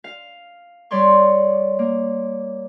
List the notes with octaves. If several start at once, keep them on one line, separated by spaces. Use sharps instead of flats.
F5
G3 C#5 D5 C6 C#6
A#3